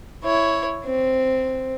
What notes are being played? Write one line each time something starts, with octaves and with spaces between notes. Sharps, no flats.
E4 C#5
C4